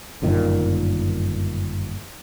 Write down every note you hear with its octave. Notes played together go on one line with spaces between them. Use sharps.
G1 F#2 A#2 D#3